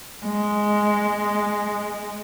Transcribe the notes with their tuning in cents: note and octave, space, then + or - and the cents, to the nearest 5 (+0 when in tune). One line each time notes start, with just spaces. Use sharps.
G#3 +0